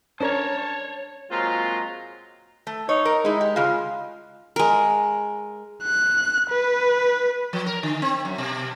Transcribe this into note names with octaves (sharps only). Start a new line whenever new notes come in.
C#4 D4 A#4 C5 C#5 A5
A#2 F#3 G#3 C4 F4 A#5
A3
D#4 C#5
A#4
G#3 D#4 E4
G4
C#3 G#3 F4
G#3 A#4
F#6
B4
F3
A#4
D3
C4
F#2
B2